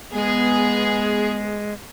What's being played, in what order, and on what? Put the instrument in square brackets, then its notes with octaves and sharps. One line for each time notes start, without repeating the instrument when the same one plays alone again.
[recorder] G#3 [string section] B3 G#4